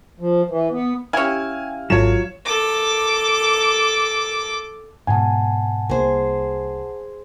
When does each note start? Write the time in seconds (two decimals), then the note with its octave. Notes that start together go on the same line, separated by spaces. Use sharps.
0.20 F3
0.49 E3
0.71 B3
1.13 C#4 E4 G4 F5 G#5 F6
1.90 G#1 F#3 F4 A4 C#5 E7
2.46 A4 D6
5.07 G#2 B2 F#5 G#5 A5
5.89 C2 A#3 G#4 C5